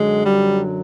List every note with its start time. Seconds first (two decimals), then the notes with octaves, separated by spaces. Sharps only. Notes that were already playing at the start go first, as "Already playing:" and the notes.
Already playing: F#2 D3 F#3 G#3
0.24 G3